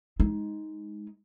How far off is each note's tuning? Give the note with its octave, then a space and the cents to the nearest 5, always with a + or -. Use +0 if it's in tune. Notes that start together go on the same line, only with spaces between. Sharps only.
G#3 +0 D#4 +10